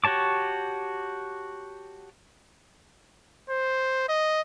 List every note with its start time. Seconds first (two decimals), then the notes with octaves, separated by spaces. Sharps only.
0.04 F#4 G4 C#5 A5 D6
3.50 C5
4.09 D#5